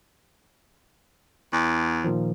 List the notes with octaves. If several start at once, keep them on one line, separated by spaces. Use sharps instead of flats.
E2
A#2 D#3 F3